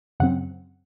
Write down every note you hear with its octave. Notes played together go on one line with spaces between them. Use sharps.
F#2 C#3 F#3 C4 F#5